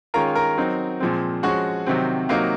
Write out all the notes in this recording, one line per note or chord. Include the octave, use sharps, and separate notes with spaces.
D#3 G#3 C#4 F4 A#4 A#5
A#4 A#5
F#3 C4 D#4
A#2 F3 G#3 C4
F3 G#3 C#4 F#4 F#5
C3 D#3 F#3 C4
C3 F#3 A#3 D#4 F5